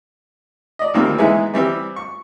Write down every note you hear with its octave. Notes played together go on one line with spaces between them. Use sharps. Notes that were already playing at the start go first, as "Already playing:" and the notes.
D5 D#5
D2 A#2 D#3 G3 C4
E3 G#3 B3 D#4 E4
E3 G3 C4
C#6